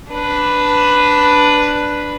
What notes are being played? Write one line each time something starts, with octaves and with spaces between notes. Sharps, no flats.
D4 B4